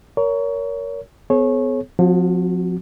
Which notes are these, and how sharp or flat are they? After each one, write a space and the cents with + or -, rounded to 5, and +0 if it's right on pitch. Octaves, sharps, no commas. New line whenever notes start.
A#4 +0 C#5 +25
B3 +35 G#4 +45 C#5 -20
F3 +35 C4 +0 F#4 +0